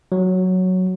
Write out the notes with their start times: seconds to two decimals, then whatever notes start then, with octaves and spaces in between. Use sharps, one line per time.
0.12 F#3